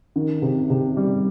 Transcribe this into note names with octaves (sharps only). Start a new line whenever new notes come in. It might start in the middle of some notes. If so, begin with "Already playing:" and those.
D#3
C3
C3
G3